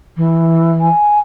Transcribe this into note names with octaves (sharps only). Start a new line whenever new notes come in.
E3
G#5